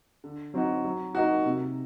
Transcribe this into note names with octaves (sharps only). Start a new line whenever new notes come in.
D3
F#3 C4 D#4 F#4
F#3
A#3 D#4 F#4
C3